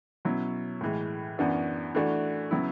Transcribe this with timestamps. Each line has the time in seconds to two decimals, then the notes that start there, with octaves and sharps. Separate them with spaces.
0.25 B2 F#3 C#4 E4
0.81 A2 E3 G#3
1.38 F#2 E3 B3 D4 F#4
1.95 E3 A3 D4 F#4
2.51 C#3 F#3 B3 E4